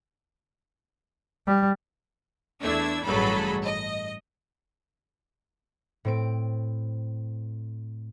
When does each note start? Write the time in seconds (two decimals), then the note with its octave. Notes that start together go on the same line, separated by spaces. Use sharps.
1.47 G3
2.61 E2 A3 D4 E4 E6 G#6
3.05 A1 G2 F#3 G#4 A4 B5
3.64 D#5
6.05 A2 C4 D7